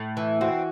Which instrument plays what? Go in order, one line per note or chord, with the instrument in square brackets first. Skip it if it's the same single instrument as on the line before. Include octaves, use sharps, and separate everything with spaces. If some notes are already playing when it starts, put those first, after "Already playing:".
Already playing: [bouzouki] A2
E3
[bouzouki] C4 [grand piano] F#4